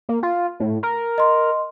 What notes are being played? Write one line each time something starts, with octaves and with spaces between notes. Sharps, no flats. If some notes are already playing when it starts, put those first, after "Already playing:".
A#3
F4
A2
A#4
D#5 C6